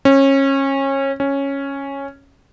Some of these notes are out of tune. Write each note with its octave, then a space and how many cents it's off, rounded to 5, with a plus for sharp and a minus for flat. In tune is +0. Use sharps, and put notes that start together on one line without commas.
C#4 -25
C#4 -5